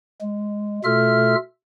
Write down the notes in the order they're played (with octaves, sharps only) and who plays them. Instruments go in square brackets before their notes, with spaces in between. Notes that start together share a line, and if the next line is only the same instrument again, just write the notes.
[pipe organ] G#3
B2 A3 F4 A4 E5 F6